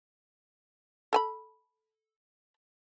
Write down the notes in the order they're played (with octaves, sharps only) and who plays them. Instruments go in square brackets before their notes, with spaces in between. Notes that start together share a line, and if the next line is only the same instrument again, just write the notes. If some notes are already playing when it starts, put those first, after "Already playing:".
[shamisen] A4 G#5 B5